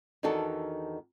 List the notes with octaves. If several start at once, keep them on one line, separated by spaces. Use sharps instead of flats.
E2 D#3 D4 D#4 F#4 A4